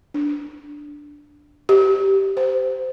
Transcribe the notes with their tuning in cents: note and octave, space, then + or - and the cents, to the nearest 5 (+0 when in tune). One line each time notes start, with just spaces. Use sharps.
D4 +0
G4 -10
C5 -20